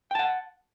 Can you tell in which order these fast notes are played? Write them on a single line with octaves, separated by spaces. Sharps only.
G5 A5 F#5